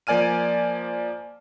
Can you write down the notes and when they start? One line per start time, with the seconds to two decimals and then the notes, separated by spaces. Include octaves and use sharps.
0.07 F3 A#3 D5 G#5 F6 D#7